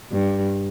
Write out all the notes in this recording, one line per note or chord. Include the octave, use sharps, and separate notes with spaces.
G2